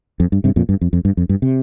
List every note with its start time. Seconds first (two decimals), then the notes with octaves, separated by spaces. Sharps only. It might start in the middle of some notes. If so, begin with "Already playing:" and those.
0.20 F2
0.32 G2
0.44 G2 C3
0.56 F2 A#2
0.69 G2
0.81 F2
0.93 F2
1.05 G2
1.17 F2
1.29 G2
1.42 C3